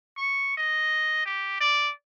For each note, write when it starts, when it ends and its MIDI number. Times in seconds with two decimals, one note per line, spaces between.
0.17 0.55 85
0.57 1.22 75
1.25 1.59 67
1.60 1.91 74